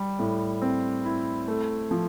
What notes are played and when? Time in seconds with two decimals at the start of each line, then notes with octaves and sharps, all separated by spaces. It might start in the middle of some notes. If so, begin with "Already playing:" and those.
Already playing: G3
0.19 A2
0.62 C4
1.05 E4
1.48 A3
1.91 F3